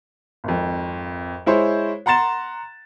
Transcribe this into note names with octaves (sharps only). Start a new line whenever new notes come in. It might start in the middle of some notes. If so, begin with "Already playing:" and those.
G#1 F2
G#3 E4 C5 C#5
F#5 A#5 C6 A6 E7